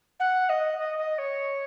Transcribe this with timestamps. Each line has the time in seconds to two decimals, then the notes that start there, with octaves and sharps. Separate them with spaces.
0.19 F#5
0.49 D#5
0.78 D#5
0.98 D#5
1.18 C#5